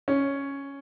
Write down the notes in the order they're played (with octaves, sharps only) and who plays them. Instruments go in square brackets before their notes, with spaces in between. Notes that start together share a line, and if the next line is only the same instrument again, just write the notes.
[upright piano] C#4